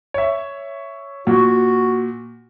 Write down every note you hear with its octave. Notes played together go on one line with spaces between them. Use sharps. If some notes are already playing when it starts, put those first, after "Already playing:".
C#5 E5
A#2 F#4